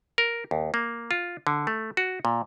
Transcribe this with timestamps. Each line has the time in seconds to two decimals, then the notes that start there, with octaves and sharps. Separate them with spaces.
0.18 A#4
0.51 D#2
0.74 A#3
1.11 F4
1.47 D3
1.67 A3
1.97 F#4
2.25 A#2